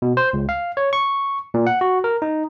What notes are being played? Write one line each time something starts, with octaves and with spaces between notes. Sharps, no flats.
B2
C5
C#2
F5
C#5
C#6
A#2
F#5
F#4
A#4
D#4